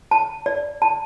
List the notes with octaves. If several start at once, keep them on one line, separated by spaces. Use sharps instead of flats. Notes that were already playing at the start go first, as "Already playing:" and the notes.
A5
D5
A5